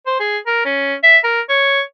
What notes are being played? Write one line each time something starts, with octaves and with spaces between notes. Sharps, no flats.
C5
G#4
A#4
C#4
E5
A#4
C#5